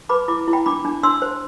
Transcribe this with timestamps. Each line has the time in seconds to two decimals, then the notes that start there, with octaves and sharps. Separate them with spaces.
0.09 B4 B5 D6
0.28 E4 B5 D6
0.48 E4
0.53 G5 B5
0.66 D4 B5 D6
0.85 D4
1.03 D4 C6 E6
1.22 C5